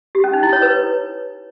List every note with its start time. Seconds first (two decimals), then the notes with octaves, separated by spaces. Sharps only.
0.15 G4
0.24 C#4
0.33 D#4
0.43 E4
0.53 C#5
0.62 B4